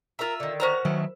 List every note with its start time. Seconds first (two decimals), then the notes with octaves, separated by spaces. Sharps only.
0.19 F4 A#4 E5 A#5
0.40 D3 D#3
0.60 C#4 F#4 A#4 C5 A#5
0.85 D#3 F#3 E4